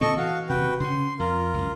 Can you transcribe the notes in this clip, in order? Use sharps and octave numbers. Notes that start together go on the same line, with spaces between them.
A#2 D3 C4 A4 D#5 C#6
E3 F#4 F5
D#1 C3 F#4 B4 G5
C#3 C#4 C6
F2 F4 A#4
C#2 F#2